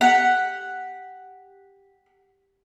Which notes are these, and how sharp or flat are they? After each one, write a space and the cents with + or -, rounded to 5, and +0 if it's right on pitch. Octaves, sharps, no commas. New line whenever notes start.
G4 +5 F#5 +0